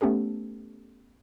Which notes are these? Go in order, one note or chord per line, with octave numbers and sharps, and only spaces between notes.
A3 B3 C#4 G4 A4